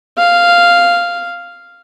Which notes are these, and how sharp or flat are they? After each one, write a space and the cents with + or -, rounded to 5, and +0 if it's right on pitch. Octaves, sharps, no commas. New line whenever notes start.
F5 -5